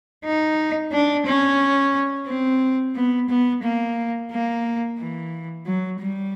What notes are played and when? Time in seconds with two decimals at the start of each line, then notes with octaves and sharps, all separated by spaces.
0.24 D#4
0.92 D4
1.26 C#4
2.27 C4
2.96 B3
3.29 B3
3.63 A#3
4.31 A#3
4.98 E3
5.66 F#3
6.00 G3